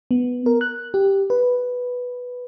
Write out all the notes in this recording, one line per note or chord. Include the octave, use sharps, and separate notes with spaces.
B3
A#4
F#6
G4
B4